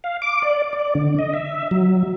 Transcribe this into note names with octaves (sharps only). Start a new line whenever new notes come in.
F5
D6
D5
D5
D3
D#5
E5
F#3